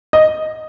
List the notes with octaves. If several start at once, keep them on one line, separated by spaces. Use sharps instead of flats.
D#5